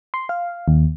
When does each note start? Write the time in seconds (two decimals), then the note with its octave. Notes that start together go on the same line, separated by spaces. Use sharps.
0.14 C6
0.29 F5
0.68 D#2